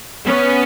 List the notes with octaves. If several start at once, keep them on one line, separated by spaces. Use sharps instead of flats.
B3 C#4